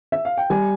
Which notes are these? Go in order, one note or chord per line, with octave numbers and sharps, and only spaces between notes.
E5
F5
G5
G3 G#5